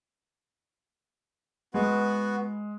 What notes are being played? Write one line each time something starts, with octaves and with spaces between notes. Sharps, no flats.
G#3 B3 F#4 B4